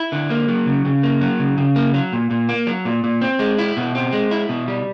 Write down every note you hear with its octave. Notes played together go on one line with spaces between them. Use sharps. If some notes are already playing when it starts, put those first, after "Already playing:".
Already playing: E4
D3
A#3
F#3
C#3
C#3
A#3
F#3
C#3
C#3
A#3
F#3
A#2
A#2
A#3
F#3
A#2
A#2
C4
G#3
E4
B2
C4
G#3
E4
B2
G3